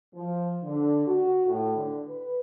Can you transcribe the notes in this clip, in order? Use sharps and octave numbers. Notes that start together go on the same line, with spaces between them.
F3
D3
F#4
A2
D3
B4